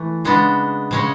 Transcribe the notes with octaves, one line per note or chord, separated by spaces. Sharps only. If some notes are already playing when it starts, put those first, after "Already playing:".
Already playing: E3 A3
C#3 G#3 B3 D4
C#3 G#3 C#4